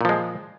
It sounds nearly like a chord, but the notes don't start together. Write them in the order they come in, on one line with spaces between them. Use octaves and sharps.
A#2 F3 G#3